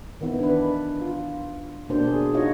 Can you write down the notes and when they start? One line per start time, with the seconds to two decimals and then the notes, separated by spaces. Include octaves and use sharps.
0.21 D#3 E3 B3 E4
0.39 D4 B4
1.01 F4
1.89 B2 A#3 D4 C5
2.07 G#4
2.34 D#4 F4 F#4 C#5 D#5